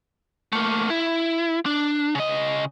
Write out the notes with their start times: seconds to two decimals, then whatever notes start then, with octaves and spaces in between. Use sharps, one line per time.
0.53 A3 A#3
0.90 E4
1.66 D4
2.15 C#3 D#5